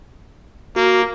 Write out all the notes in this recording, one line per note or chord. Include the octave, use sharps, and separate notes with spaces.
A#3 F#4